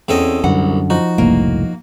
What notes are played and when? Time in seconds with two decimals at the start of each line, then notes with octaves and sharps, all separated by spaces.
0.08 E2 C4 C#4 A4 D#5
0.44 C2 F#2 D3 F#5
0.90 F3 D#4 F#4
1.18 F#1 C2 A2 A#3